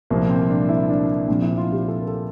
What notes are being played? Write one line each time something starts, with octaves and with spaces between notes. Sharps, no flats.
C2 A#2 F3 A#3
C4
D4
E4
D4
A#1 A#2 F3 C4
E4
F4
G4
A4
A#4
A4